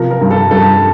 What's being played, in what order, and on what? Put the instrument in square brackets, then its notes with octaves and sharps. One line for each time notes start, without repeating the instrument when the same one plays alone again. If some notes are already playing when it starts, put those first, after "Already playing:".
Already playing: [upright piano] C3 F3 A#4
A#4
G2
A4
G2 A4